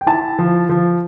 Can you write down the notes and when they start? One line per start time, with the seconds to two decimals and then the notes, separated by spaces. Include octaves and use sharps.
0.01 G5
0.07 E4 A5
0.39 F3
0.69 F3